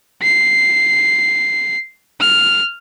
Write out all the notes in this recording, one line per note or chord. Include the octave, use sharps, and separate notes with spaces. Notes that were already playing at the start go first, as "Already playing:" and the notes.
C7
F6